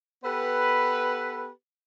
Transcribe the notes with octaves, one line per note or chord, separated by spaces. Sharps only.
B3 G4 A4 B4